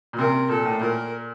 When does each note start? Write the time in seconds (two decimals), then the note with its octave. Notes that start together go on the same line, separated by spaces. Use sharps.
0.13 A#2
0.18 C3 A#4
0.49 A#2 A4
0.65 A2
0.81 A#2 A#4